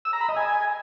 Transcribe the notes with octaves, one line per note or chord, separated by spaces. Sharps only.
E6
A#5
B5
D#5
G#5